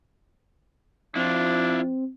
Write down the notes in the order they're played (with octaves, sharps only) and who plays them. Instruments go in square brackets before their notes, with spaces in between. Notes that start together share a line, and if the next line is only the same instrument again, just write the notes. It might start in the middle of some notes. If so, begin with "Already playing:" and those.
[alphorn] F3 [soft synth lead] C4 [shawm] D4 [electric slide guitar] E4 F4